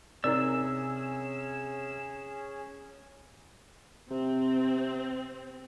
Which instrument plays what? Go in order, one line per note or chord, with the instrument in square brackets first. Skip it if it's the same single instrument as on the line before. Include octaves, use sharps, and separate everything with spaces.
[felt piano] C3 [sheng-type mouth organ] C#4 G#4 [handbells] D#4 A#4 D5 [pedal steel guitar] E6
[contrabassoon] C3 [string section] C4